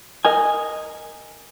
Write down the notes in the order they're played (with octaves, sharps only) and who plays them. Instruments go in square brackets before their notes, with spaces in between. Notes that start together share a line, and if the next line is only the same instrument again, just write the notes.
[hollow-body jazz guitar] A#4 D#5 G#5